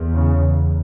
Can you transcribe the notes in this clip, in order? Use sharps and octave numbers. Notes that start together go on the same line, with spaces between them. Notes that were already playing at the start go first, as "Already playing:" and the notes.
Already playing: E2
C#3